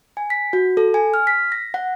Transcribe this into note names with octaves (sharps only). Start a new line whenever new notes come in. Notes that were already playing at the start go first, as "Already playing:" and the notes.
G#5
B6
F#4
A4
G#5
F6
B6
A#6
F#5